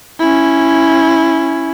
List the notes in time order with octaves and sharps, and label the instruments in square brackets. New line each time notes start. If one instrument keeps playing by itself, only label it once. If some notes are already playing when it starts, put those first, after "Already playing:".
[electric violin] C#4 E4